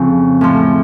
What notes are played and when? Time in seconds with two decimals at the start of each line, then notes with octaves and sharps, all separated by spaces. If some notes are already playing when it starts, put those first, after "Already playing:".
Already playing: F2 C#3 F3
0.41 A2 F3